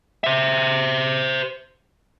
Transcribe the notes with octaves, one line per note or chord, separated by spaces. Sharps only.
C5 E5